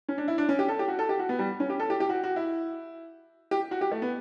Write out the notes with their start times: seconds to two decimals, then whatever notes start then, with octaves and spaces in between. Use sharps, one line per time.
0.09 C#4
0.18 D4
0.28 E4
0.38 D4
0.49 C#4
0.59 G4
0.68 A4
0.79 G4
0.88 F#4
0.99 A4
1.09 G4
1.19 F#4
1.29 B3
1.39 G3
1.60 C#4
1.70 G4
1.80 A4
1.90 G4
2.00 G4
2.09 F#4
2.23 F#4
2.36 E4
3.51 G4
3.71 F#4
3.81 G4
3.91 A3
4.02 B3